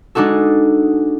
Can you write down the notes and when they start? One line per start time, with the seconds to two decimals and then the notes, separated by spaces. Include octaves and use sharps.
0.15 G#3 D4 D#4 F#4 A4